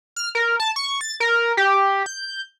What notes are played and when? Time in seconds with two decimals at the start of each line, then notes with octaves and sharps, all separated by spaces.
0.16 F6
0.35 A#4
0.60 A5
0.76 C#6
1.01 A6
1.20 A#4
1.57 G4
2.06 G6